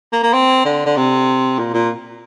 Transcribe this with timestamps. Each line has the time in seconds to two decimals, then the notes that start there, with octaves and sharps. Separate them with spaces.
0.12 A#3
0.23 A#3
0.33 C4
0.65 D3
0.86 D3
0.96 C3
1.59 A#2
1.74 A#2